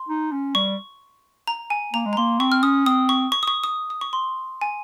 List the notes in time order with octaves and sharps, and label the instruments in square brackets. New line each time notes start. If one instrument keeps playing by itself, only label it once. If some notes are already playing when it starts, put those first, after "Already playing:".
Already playing: [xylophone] C6
[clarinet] D#4
C#4
[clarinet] G3 [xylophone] C#6
[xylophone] A#5
G#5
[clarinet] A#3 [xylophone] A#5
[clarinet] G#3
[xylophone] A#5
[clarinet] A#3 [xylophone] C6
[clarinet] C4 [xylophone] C#6
[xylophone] F6
[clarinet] C#4 [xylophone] D#6
[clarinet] C4 [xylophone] D#6
[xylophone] C#6
C#6
D#6
C#6
D#6
D#6
C#6
C6
G#5